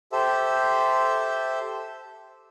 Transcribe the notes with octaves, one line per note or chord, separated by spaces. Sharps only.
G4 A4 C5 E5